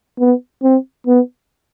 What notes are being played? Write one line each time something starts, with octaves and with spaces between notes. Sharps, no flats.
B3
C4
B3